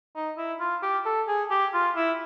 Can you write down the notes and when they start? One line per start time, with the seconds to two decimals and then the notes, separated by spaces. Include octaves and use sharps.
0.16 D#4
0.38 E4
0.60 F4
0.83 G4
1.06 A4
1.28 G#4
1.51 G4
1.74 F4
1.96 E4